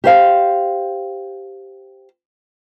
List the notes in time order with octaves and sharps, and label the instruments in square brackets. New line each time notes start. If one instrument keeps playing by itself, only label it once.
[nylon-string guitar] G4 C5 F5